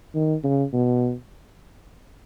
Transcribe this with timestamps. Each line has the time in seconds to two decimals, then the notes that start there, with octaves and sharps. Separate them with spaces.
0.15 D#3
0.44 C#3
0.73 B2